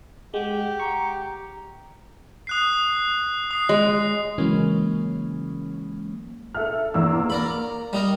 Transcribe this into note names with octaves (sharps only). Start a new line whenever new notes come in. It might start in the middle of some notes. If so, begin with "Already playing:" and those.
G#3 G4 F#5
A#5 C#6
D#6 F#6 C7
D#6 C7
G#3
C#3 E3 F#3 G#3 A#3 C#4
A4 E5 F6
E2 A#3 E6
A#3 A#4 D5 B5
G3 D#4 A#4